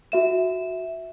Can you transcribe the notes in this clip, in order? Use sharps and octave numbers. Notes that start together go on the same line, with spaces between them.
F#4 E5 E7